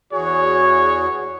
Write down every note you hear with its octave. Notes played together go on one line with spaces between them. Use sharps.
E2 F#4 G#4 C#5